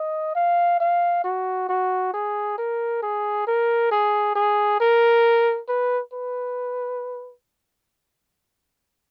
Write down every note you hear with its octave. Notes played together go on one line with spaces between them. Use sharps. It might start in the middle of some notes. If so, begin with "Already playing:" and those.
Already playing: D#5
F5
F5
F#4
F#4
G#4
A#4
G#4
A#4
G#4
G#4
A#4
B4
B4